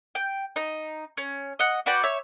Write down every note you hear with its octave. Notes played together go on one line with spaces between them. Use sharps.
G5
D#4
C#4
D#5 F#5
F#4 B4 D5 G5
C#5 E5